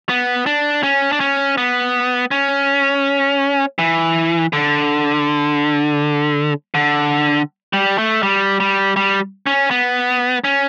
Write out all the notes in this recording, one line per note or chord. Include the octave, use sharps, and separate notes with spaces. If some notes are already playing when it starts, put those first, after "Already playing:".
B3
D4
C#4
D4
C#4
B3
C#4
E3
D3
D3
G3
A3
G3
G3
G3
C#4
B3
C#4